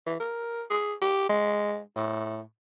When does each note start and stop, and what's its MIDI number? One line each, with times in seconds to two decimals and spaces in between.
0.06 0.16 52
0.20 0.63 70
0.70 0.94 68
1.02 1.29 67
1.29 1.80 56
1.96 2.41 45